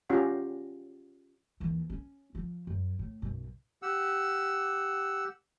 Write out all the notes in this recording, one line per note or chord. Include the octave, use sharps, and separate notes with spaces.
C#4 F4 G4 F#5 A#5
D#2 E3
C#4
F3
F#2
A2
B1 F#2
G4 F#5 E6